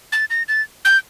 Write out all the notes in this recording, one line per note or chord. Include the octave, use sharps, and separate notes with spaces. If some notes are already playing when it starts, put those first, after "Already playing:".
A6
A#6
A6
G6